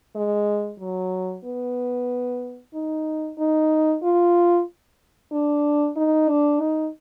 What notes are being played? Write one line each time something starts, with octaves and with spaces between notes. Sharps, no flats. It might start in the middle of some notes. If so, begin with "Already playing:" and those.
G#3
F#3
B3
D#4
D#4
F4
D4
D#4
D4
D#4